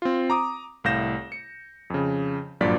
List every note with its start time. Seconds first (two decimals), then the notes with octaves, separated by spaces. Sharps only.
0.02 C4 F4
0.30 A#5 D6 D#6
0.84 C2 A2 F5 G6 A#6 E7
1.32 C#7
1.90 F2 C#3
2.61 G#1 G2 A#2 F#3 D5 B6